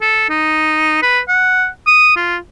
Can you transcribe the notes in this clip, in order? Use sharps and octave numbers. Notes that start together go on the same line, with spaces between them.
A4
D#4
B4
F#5
D#6
F4